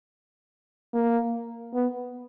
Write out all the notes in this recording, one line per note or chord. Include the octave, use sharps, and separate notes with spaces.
A#3
B3